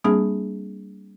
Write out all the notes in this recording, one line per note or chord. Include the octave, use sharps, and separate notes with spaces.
G3 A#3 C4 D4 G#4